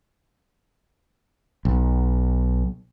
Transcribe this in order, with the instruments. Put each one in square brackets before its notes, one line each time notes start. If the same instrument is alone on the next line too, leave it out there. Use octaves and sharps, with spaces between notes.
[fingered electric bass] B1